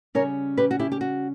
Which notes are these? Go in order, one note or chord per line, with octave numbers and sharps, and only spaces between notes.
C#3 G3 C#4 A#4 C#5
G4 B4
F#4
E4 G4
G4
F#4